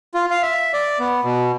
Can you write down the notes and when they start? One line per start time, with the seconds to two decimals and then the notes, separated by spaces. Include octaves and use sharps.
0.14 F4
0.31 F5
0.42 E5
0.73 D5
0.99 B3
1.24 B2